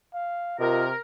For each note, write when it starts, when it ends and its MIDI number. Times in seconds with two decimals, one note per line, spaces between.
0.14 0.55 77
0.59 0.92 48
0.59 0.87 65
0.59 0.97 70
0.59 0.86 75